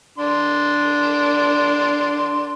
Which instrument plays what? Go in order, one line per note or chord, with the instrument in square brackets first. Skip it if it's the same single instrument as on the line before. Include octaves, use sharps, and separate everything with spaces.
[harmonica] D4 C6